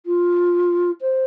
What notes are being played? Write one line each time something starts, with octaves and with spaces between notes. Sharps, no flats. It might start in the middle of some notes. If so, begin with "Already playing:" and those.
F4
C5